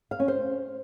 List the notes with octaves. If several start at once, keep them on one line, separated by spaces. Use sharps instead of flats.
F5
C#4
C5